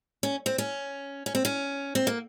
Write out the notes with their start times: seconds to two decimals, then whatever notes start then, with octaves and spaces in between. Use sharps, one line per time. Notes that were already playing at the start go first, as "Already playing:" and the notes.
0.23 C#4
0.46 C4
0.58 C#4
1.26 C#4
1.35 C4
1.45 C#4
1.95 C4
2.07 A#3